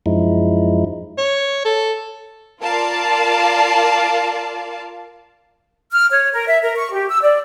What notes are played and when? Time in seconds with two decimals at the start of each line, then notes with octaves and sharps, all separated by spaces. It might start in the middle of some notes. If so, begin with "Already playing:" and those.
0.06 F#2 F3 G#3 D#4 E4
1.18 C#5
1.65 A4
2.62 F4 A#4 D5 F5 A5
5.91 F6
6.10 C#5
6.33 A#4
6.47 E5
6.63 A#4
6.76 C#6
6.92 G4
7.09 E6
7.22 D5